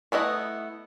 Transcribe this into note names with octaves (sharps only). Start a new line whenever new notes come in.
A3 B3 E4 D#5